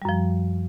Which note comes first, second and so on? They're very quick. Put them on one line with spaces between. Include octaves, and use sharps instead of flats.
G3 F#2 F3